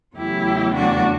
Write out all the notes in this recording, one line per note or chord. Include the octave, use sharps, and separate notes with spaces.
E2 C#3 F#3 A3 E4 G4
D4 F#4